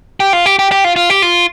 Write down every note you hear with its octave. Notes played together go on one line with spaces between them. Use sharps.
G4
F4
G4
G4
G4
F4
F4
G4
F4